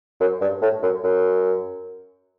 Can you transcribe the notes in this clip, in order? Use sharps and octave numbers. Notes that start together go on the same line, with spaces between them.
F#2
G2
A2
F#2
F#2